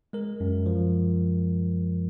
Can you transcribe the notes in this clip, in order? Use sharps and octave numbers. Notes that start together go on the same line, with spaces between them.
G#3 A#4
F#2
F3